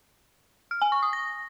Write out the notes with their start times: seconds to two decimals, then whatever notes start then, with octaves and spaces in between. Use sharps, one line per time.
0.71 F6
0.82 G#5
0.92 C#6
1.02 D#6
1.13 A#6